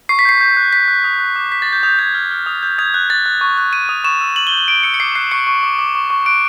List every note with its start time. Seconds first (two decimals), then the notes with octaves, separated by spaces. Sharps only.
0.09 C#6 C7
0.19 B6
0.25 G6 C7
0.41 G6
0.57 F#6
0.73 F#6 B6
0.88 F#6
1.04 D#6
1.20 F#6
1.36 D6
1.52 G6 B6
1.62 A6
1.67 D6
1.73 G6
1.83 D#6 G6
1.99 G6 G#6
2.14 F6
2.31 F6
2.46 D#6
2.63 G6
2.78 D#6 G#6
2.94 F#6
3.10 F#6 A6
3.26 F#6
3.41 C#6
3.58 F#6
3.73 F#6 D#7
3.89 D#6
4.04 C#6 E7
4.21 E6
4.36 D6 F#7
4.47 G7
4.52 G6
4.58 G7
4.68 G6 D7
4.83 E6 C#7
4.94 C#7
5.00 D6 C7
5.15 F#6 C7
5.31 C#6 C#7
5.47 C#6
5.63 D6
5.79 D6
5.95 C#6
6.10 C#6
6.26 F#6 D7